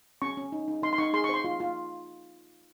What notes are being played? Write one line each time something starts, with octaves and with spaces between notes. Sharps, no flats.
C#4 C#6
C#4
D#4
D#4
D#4 C6
C6
D#4 C#6
G#4 C6
C#6
C5 C6
F4
F4